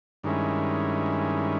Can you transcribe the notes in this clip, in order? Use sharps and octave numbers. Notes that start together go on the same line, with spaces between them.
G2 D#3 G#3 C#4 E4